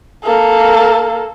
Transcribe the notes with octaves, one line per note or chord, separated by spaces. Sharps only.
A#3 A4